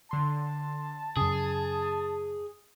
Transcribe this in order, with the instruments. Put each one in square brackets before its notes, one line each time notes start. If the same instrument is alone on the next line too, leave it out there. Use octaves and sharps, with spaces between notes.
[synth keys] D3 C6 [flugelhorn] A5
[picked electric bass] F#2 C#3 [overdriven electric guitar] G#4 [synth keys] D#6